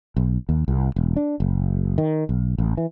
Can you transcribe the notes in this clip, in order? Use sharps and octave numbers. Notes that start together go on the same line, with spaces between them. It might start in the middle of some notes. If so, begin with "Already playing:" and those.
B1
D#2
C2
E1
D4
F#1
D#3
B1
A1
E3